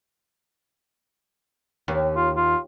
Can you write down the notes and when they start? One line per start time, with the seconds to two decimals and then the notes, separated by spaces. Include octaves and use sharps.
1.88 D#2
2.16 F4
2.37 F4